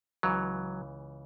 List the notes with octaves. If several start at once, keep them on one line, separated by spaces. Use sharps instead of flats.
C#2 C#3 E3 F#3